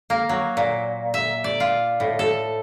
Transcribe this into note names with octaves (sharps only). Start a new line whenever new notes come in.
A#3
F#3
A#2
E5
D5
F4
A2
A4